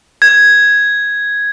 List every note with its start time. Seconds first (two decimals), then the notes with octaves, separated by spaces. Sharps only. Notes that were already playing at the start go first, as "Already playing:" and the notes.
0.22 G#6